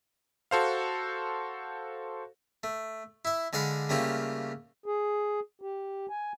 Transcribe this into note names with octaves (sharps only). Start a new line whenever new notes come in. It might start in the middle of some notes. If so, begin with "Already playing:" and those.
F#4 A4 C5 F5
A3
E4 E5
D3 G#3 D5 F5 F#5 B5
C#3 G3 A3 A#3 F4 G4
G#4
G4
G#5